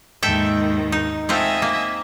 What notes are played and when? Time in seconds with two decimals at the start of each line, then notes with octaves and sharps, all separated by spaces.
0.23 D#2 G#2 D#3 A4 E5 G5
0.92 D#4
1.29 A3 C4 F4 D#5 E5 G#5
1.62 A#3